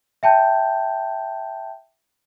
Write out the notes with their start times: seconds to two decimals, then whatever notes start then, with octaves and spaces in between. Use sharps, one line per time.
0.23 E5 G5 A5 G6